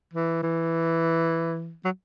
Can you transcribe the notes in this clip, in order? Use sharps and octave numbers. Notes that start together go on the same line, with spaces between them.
E3
E3
F#3